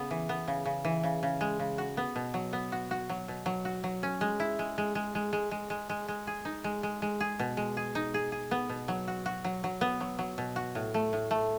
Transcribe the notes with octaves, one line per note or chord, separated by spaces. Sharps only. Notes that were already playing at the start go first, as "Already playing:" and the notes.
Already playing: C#3 B3
E3
B3
C#3
C#3
E3
C#3
C#3
G#3
C#3
F#4
B3
B2
F#3
B3
F#4
F#4
F#3
B2
F#3
F#4
F#3
C#4
G#3
E4
G#3
G#3
G#3
G#3
G#3
G#3
G#3
G#3
G#3
G#4
D#4
G#3
G#3
G#3
G#4
B2
G#3
G#4
D#4
G#4
G#4
B3
B2
F#3
F#4
F#4
F#3
F#3
B3
F#3
F#3
B2
F#4
A2
A3
A2
A3